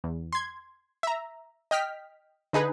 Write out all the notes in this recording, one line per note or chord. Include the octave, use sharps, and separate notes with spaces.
E2
C6 G#6
E5 A#5
D#5 G5 F6 B6
D3 D#4 G#4 B4